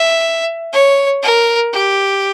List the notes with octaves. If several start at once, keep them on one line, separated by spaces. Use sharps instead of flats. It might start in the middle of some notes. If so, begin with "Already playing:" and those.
Already playing: E5
C#5
A#4
G4